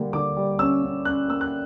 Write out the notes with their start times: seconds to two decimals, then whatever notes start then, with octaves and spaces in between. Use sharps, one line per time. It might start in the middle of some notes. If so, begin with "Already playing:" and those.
Already playing: D3 G3 A#3
0.13 D3 D6
0.36 G3
0.59 C#4 E6
0.82 C#4
1.05 C#4 F#6
1.28 A#3 E6
1.41 F#6